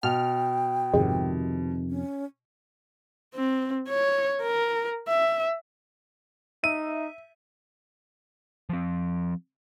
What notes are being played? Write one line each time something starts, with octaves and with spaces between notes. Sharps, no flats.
B2 G5 F6
G#1 F2 C3 D#3 G#3
C#4
C4
C#5
A#4
E5
D#4 E5 D#7
F3 C4